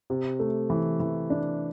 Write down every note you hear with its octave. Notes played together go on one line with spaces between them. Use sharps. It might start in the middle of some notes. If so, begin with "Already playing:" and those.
C3
A3
E3
E3
D4